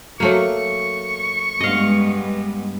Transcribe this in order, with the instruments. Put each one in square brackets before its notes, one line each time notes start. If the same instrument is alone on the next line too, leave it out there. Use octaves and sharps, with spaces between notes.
[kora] F#3 A3 A#3 [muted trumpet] C#6
[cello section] G2 G#3 B3 [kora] D#5 F5